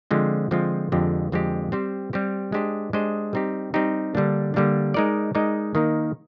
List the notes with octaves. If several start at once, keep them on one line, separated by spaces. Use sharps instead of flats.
D3 F3 G#3 C4 F4
D3 F3 G#3 C4 F4
F2 D3 G#3 C4 G4
F2 D3 G#3 C4 G4
G3 C4 G4 C5
G3 C4 G4 C5
G#3 D4 G4 C5 D#5
G#3 D4 G4 C5 D#5
G3 C4 D#4 G4
G3 C4 D#4 G4
D3 G3 A#3 D4
D3 G3 A#3 D4
G#3 D#4 A#4 D5
G#3 D#4 A#4 D5
D#3 A#3 D#4 A#4